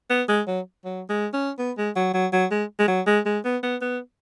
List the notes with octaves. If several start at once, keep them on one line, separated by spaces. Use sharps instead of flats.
B3
G#3
F#3
F#3
G#3
C#4
B3
G#3
F#3
F#3
F#3
G#3
G#3
F#3
G#3
G#3
B3
B3
B3